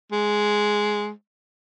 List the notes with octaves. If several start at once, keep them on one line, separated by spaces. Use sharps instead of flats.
G#3